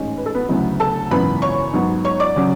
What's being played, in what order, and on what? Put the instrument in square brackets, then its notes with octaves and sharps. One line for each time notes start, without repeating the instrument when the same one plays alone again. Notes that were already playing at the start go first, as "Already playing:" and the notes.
Already playing: [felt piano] A1 G#2 G#3 C#4
B4
A4
B3 B4
D2 C#3 F#3 B3 E4
A4 A5
G#1 F#2 C#3 E3 B3 B4 B5
C#5 C#6
G#2 F#3 B3
C#5 C#6
D5 D6
C#3 F#3 C#4